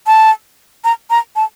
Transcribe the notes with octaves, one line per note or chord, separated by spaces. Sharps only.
A5
A#5
A#5
A5